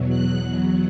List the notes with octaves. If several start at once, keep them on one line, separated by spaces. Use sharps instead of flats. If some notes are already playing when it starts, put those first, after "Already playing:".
Already playing: E2 B2 F#3
F#6